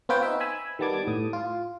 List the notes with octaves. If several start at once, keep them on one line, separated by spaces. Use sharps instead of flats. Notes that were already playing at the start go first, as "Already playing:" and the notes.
B3 C4 F4 B4 C#5 G5
D#4 E5
G#5 B5 E6
D#3 G3 B3 A5 D6 G#6
A2 D#6
F4